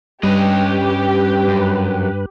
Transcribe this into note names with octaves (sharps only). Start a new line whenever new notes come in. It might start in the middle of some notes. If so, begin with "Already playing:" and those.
G2 G3 C#4 G4 B4 D#5
F#2